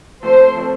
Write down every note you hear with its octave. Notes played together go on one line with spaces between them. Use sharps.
F3 A3 C4 C5
F3 A3 C4